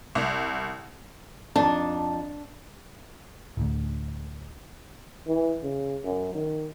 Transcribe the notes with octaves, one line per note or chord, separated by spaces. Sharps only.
C2
F2 D4 D#4 A5
D1 D2
E3
C#3
F#2
D#3